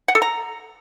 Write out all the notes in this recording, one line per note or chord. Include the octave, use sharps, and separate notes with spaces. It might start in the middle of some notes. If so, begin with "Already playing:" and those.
F#5
A4
A#5